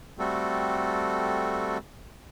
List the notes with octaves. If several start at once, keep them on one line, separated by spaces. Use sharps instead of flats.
G3 A3 C4 F#4 A4